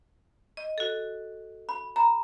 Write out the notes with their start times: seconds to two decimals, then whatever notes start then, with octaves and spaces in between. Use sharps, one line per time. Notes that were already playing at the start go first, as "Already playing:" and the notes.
0.57 D#5
0.78 F#4 A4
1.69 B5
1.96 A#5 B5